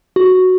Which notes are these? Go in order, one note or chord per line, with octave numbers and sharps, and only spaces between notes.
F#4